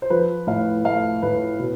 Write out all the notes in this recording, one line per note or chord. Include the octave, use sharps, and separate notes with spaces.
C5
F3 B4
A2 F5
A3 F5
A2 B4
B2 B4